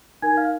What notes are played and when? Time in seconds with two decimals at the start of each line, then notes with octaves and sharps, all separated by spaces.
0.22 D#4 A#4 G#5 G#6
0.37 F5 F6